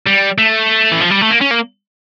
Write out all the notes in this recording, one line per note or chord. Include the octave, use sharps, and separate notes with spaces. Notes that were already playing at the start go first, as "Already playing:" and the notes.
G3
A3
E3
F3
G3
A3
A#3
C#4
A#3